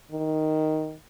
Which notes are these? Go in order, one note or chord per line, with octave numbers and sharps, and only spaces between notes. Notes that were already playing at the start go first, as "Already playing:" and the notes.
D#3